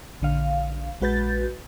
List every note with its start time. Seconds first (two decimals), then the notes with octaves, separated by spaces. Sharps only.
0.21 A#1 D3 F5
1.01 A#1 G#3 F#4 B4 G6 A6